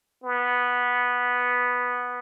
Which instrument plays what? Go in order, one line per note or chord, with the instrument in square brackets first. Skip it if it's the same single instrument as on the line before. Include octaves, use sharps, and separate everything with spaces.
[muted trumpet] B3